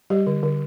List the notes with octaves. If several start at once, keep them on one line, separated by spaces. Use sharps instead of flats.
G3 G4
D3
D3